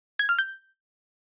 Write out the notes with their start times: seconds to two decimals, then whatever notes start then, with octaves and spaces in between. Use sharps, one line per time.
0.19 G#6
0.29 F6
0.39 G6